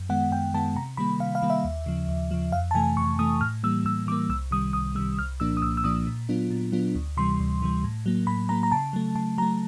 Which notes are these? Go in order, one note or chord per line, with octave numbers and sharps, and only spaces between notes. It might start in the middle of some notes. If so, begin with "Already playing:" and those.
Already playing: F#2
D#3 G#3 B3 F#5
F#2 G5
D#3 G#3 B3 A5
C3 A#5
D#3 G3 A#3 B5
C3 F5
F5
D#3 G3 A#3
E5
D#2
C#3 F3
D#2
C#3 F3
F2 F5
A5
C3 E3 A3 G#5
F2 C#6
C3 E3 A3 D#6
A2 F6
E3 G3 A#3 E6
A2 E6
E3 G3 A#3 D6
C2 E6
C3 D#3 G3 D#6
C2 D#6
C3 D#3 G3 E6
C2 F6
A#2 F3 A#3 D4 E6
D#6
C2 E6
E6
A#2 F3 A#3 D4 D#6
A#2
F#3 B3 D4 F4
A#2
F#3 B3 D4 F4
D2
C3 E3 G3 C6
D2
C3 E3 G3
A2
F#3 A#3
A2 B5
F#3 A#3 A#5
A#5
C#3 A5
F#3 A3
C#3 A5
F#3 A3 A#5